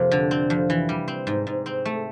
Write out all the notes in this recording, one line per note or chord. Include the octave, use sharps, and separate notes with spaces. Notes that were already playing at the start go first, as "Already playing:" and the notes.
Already playing: F2 C3 A#3
D3
C4
F2
E3
G3
C4
G#2
G#2
C4
A3